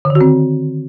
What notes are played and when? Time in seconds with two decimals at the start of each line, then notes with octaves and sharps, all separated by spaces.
0.05 D3
0.10 D#3
0.15 F#4
0.21 C4